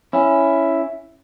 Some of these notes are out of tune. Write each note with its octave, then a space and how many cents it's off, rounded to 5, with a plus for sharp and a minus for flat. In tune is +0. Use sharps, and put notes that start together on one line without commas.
C#4 +0 E4 +5